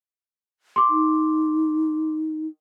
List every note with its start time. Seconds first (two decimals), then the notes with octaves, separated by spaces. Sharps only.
0.76 C6 D6
0.90 D#4